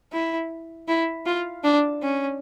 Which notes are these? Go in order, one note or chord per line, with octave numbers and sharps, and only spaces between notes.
E4
E4
F4
D4
C#4